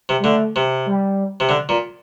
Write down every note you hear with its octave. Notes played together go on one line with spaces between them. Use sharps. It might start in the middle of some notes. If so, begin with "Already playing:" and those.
C3
G3
D3 A3
C3
G3
C3
D3
A#2